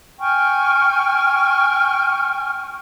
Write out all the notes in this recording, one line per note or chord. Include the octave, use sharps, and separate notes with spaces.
G5 G#5 C#6 F6